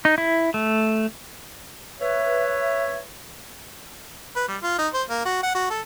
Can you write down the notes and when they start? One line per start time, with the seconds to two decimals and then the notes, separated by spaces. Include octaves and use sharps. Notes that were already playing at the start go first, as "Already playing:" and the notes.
0.05 D#4
0.18 E4
0.54 A3
2.01 B4 C#5 E5
4.36 B4
4.48 G3
4.62 F4
4.79 D#4
4.94 C5
5.09 A#3
5.25 F#4
5.43 F#5
5.55 F#4
5.70 A4